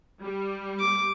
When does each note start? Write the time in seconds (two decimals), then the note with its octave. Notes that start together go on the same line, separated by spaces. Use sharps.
0.23 G3
0.79 D6